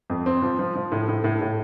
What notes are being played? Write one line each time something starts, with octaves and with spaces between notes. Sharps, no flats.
F2
C4
F3
F3
F3
A2
A2
A2
A2